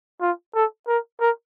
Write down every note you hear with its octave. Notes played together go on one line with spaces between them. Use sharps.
F4
A4
A#4
A#4